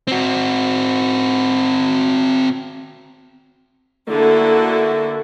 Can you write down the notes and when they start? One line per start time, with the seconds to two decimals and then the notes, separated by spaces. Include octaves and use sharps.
0.07 C4 F#4
4.09 D3 A#3 E4 F#4 A4